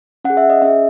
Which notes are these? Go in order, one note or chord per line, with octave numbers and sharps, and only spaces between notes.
C#4 F#5
G#4
E5
D#5
C#4 G#4 E5